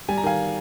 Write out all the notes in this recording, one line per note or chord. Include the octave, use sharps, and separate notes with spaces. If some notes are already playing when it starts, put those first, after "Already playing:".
G3 G#5
A#5
D#3 F5 G#5